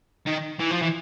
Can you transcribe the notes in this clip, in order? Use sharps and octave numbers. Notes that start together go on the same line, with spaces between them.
D#3
E3
F3
E3